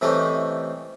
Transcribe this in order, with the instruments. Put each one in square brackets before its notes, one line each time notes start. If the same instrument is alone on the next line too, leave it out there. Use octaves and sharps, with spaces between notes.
[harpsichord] C3 E3 A3 C#4 D#4